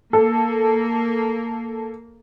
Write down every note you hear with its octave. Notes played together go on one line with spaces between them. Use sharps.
A#3 A4